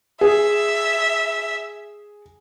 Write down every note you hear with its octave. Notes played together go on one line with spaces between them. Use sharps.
G#4 E5